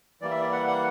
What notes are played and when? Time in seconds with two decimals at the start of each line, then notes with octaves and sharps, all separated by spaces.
0.22 E3 G3 A#3 D5
0.31 E5
0.41 D5
0.52 F#5
0.67 F#5